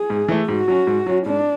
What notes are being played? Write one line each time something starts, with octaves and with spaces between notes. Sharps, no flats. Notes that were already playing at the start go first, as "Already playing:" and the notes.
Already playing: G#4
G#2
E3 A3
G#2 F#4
F#3 C#4
G#2
F#3 C#4
G#2 D4